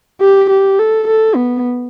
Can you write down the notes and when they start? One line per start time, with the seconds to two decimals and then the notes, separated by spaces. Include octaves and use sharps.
0.21 G4
0.50 G4
0.79 A4
1.08 A4
1.36 B3